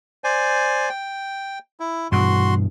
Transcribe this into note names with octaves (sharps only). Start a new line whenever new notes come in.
C5 D5 G#5
G5
E4
G2 B2 E3 F#4 C6